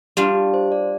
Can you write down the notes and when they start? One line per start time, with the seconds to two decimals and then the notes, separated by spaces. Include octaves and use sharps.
0.17 G3 D4 F4 G4
0.35 G4
0.54 C5
0.72 D5